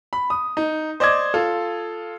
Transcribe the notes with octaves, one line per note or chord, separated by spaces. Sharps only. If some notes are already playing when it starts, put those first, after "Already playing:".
B5
D#6
D#4
C5 D5 D#5 D6 G#6
F4 A4